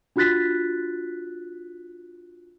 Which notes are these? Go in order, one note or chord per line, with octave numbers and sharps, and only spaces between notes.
D4 F4 F#4 F#6 A6 B6